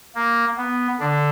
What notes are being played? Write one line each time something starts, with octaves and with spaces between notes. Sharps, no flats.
A#3
B3
D3 D4